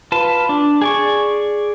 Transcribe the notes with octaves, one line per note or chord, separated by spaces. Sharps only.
F4 B4 A5
D4
G#4 D5 C#6